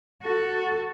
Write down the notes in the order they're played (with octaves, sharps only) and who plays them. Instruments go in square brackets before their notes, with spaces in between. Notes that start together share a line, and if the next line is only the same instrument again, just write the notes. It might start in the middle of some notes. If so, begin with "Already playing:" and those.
[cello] F#4 A4